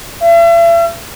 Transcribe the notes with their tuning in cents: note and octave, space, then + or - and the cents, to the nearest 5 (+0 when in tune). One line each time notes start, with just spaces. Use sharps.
E5 +40